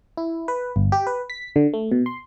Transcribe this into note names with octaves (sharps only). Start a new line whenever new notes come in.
E4
B4
G1
G4
B4
B6
D3
A3
B2
C6